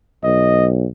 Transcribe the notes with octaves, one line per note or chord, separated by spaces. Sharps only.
B1 D#5